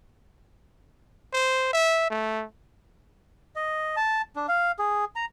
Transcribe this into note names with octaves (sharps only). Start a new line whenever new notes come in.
C5
E5
A3
D#5
A5
D4
F5
G#4
A#5